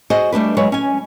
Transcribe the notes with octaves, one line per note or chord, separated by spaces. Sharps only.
F#4 G#4 C5 D#5
G3 A3 D4 B4
F#3 G#3 B4 C#5
C#4 G#5